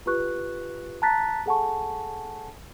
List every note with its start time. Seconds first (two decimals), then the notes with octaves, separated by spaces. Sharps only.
0.06 F4 G4 B4 C#6 F#6
1.02 A5 A#5 F#6 A6 B6
1.46 G#4 A4 F#5 G#5 A5 C#6